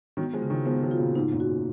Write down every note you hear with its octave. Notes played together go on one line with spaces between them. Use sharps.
D#3 F#3 B3
F3 G#3
C#3
D#3 F#3
F3 G#3 B3
D#3 F#3
F4
A#2 C#3
G#2 B2 D#4
F#2 A#2
F#4